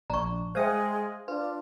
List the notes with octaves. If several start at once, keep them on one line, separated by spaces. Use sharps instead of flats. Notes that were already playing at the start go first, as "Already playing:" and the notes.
A#1 D4 A#5 C#6
G#3 C5 E5 F5 G5 G#5 D#6
D4 F4 B4